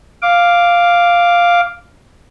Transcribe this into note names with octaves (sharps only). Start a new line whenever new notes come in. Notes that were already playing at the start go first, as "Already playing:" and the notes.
F5 D6